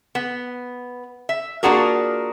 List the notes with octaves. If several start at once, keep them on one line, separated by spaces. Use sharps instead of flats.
B3
E5
A#3 D4 F4 F#4 G#4 A#4